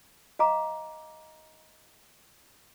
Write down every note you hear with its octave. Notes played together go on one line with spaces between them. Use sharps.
D#5 F5 A#5 D6